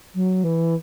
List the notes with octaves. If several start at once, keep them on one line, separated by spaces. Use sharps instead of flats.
F#3
E3